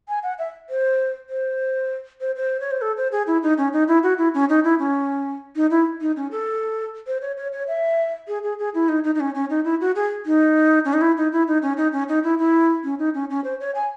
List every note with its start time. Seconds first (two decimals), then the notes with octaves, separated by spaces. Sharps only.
0.08 G#5
0.23 F#5
0.39 E5
0.70 C5
1.30 C5
2.21 C5
2.36 C5
2.60 C#5
2.71 C5
2.82 A4
2.97 C5
3.12 G#4
3.27 E4
3.43 D#4
3.58 C#4
3.73 D#4
3.88 E4
4.03 F#4
4.18 E4
4.34 C#4
4.49 D#4
4.64 E4
4.79 C#4
5.56 D#4
5.71 E4
6.01 D#4
6.16 C#4
6.31 A4
7.07 C5
7.22 C#5
7.37 C#5
7.53 C#5
7.68 E5
8.28 G#4
8.44 G#4
8.59 G#4
8.74 E4
8.89 D#4
9.04 D#4
9.15 D#4
9.20 C#4
9.35 C#4
9.50 D#4
9.65 E4
9.81 F#4
9.96 G#4
10.26 D#4
10.85 C#4
10.93 D#4
11.01 E4
11.17 D#4
11.32 E4
11.48 D#4
11.62 C#4
11.77 D#4
11.93 C#4
12.09 D#4
12.24 E4
12.39 E4
12.84 C#4
12.99 D#4
13.14 C#4
13.30 C#4
13.44 C5
13.60 C#5
13.75 G#5